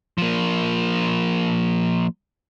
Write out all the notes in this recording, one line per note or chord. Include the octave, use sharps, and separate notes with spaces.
F3 A#3